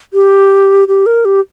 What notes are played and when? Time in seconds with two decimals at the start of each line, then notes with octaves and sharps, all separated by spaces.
0.14 G4
0.88 G4
1.06 A#4
1.25 G4